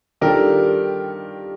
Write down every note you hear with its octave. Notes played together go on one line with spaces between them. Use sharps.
D#3 G3 D4 F4 G4 A4 A#4